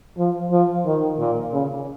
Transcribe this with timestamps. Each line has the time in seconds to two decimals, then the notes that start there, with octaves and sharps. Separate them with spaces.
0.17 F3
0.51 F3
0.86 D#3
1.19 A#2
1.52 C#3